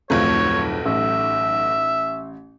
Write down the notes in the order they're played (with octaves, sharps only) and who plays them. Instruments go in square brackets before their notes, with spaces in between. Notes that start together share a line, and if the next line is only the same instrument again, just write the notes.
[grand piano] D1 F2 F4 [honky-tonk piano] B1 A3 [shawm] C#5
[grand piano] A1 [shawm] E5